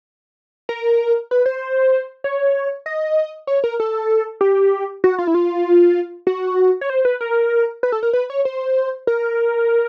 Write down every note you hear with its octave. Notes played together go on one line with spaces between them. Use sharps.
A#4
B4
C5
C#5
D#5
C#5
A#4
A4
G4
F#4
F4
E4
F4
F#4
C#5
C5
B4
A#4
B4
A4
A#4
B4
C#5
C5
A#4